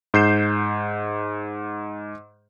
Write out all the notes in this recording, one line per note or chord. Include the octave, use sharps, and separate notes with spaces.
G#2 G6 C7 E7